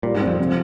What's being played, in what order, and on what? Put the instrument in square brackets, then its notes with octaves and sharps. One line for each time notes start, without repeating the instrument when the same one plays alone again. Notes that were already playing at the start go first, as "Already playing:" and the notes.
[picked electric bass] A#2 [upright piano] G3
[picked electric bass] G#2
[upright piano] C4
[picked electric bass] F2
[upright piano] C3